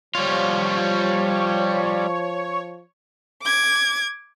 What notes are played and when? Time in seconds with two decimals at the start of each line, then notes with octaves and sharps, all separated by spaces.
0.15 F3 G3 F4 C#5
3.43 D6 G#6